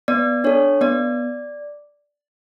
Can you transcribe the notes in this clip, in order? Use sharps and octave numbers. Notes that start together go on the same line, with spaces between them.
B3 D5
D4 A4 C#5
B3 D5